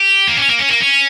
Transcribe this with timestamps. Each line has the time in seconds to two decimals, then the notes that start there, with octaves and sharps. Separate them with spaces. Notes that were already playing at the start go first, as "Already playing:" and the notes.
Already playing: G4
0.27 A#3
0.37 C#4
0.48 A#3
0.59 C#4
0.69 A#3
0.80 C#4